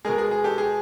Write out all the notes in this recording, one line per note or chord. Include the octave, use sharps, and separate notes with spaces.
B2 G#3 G#4 A#4
G#4
G#4
G4 A4
G#4